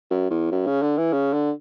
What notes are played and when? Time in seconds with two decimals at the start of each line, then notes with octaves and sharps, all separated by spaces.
0.11 F#2
0.31 E2
0.52 F#2
0.67 C#3
0.82 D3
0.98 E3
1.13 C#3
1.33 D3